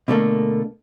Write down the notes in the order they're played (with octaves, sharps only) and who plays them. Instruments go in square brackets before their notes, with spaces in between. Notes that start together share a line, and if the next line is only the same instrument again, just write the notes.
[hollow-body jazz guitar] B2 D3 A3 A#3